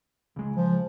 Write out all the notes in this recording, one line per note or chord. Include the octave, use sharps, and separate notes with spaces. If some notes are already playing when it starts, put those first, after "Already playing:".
C#2 G#3
F3